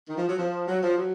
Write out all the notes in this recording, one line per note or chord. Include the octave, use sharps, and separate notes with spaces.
D#3
F3
F#3
F3
F#3
F3
F#3